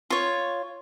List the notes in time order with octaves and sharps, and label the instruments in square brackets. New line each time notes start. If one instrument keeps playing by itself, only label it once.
[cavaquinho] F4 C#5